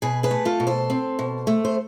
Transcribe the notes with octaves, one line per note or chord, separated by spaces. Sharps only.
B2 G#4 B4
G#4 B4
A3
F4 A4
B2
A4 C5
C4
B2
A3
C5